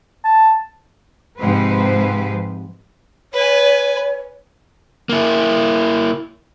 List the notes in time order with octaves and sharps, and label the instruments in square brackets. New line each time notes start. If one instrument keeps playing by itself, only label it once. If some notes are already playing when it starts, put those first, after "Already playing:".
[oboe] A5
[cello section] G#2 C3 F3 B4 C5
[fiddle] B4 G#5 [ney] C#5
[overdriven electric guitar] A#3 E4